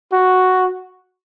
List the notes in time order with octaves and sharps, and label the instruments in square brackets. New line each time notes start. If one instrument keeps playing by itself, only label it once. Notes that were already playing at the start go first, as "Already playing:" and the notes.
[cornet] F#4